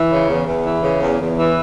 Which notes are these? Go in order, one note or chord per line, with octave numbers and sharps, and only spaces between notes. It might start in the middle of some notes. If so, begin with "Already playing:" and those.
Already playing: E3
C#3
E2
E2
E3
C#3
E2
E2
E3